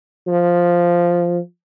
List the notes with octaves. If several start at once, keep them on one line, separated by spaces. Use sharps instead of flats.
F3